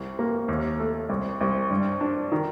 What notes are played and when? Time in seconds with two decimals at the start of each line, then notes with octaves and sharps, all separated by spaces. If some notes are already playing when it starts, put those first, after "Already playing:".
Already playing: C2
0.19 A#3
0.48 D#2
0.79 A3
1.09 C2
1.41 C2
1.70 G2
2.01 D4
2.32 D#3